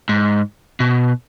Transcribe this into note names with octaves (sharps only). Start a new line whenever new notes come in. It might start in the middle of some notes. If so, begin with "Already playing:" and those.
G#2
B2